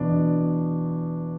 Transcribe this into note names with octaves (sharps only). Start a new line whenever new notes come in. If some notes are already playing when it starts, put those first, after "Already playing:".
Already playing: E2 B2 B3 D4